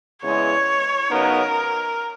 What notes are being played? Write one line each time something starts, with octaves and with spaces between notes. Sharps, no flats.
E2 C#3 E3 G#3 C#5
C#3 F#3 B3 D#4 A#4